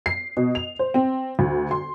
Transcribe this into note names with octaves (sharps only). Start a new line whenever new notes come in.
C7
B2
F7
C5
C4
D2
C6